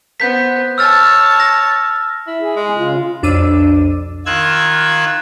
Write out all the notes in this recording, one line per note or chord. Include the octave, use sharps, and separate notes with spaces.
B3 C4 G6 B6
C#5 A5 E6 F6 A6
A#6
E4
G#4
G#3
C#3 F4
B1 F2 D4 D6 E6 D#7
D#3 F4 E6 F#6 G#6